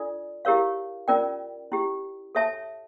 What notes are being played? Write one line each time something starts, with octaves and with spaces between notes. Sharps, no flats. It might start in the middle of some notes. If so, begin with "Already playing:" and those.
Already playing: D4 F4 A4 D5
E4 G4 A#4 C#5 F5
C#4 F4 A#4 D5 G5
C#4 E4 G4
A4 C#5 E5 A5